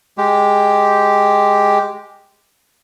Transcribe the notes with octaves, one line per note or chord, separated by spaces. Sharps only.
G#3 G4